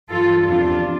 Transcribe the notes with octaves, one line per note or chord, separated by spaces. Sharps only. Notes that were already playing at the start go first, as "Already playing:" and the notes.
G2 E3 F4 A4
E2 C3 F3 D4 F4